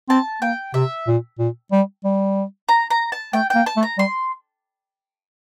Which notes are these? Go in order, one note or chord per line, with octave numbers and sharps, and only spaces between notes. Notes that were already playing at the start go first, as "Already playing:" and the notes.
C4 A5
A#3 G5
C3 E5
A#2
A#2
G3
G3
A#5
A#5
A5
A3 G5
A#3 G5
A5
A3
A#5
G3 C6